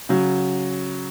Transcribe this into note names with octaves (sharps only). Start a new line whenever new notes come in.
C#3 F#3